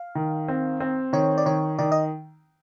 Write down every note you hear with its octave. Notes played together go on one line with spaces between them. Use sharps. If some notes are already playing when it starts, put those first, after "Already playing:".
Already playing: F5
D#3
C4
C4
D#3 C#5
D5
D#3 C#5
D#3 D5
D#5